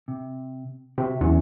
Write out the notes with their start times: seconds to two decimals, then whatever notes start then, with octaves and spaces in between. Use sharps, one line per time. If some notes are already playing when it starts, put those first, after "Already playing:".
0.08 C3
0.98 C3 F#4 E5
1.21 E2 F#3 C#4